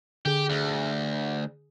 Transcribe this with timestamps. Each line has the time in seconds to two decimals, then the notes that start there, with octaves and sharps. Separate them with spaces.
0.26 D3 G4 G#4
0.50 D2